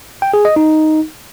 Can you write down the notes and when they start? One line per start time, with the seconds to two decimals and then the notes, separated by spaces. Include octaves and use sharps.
0.22 G5
0.34 G#4
0.45 D#5
0.56 D#4